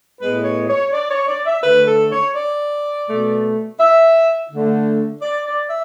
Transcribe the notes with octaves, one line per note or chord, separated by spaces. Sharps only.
A2 G#3 B3 B4
C#5
C#5
D5
C#5
D5
E5
D3 A3 B4
A4
C#5
D5
B2 A3
E5
D3 A3
D5
D5
E5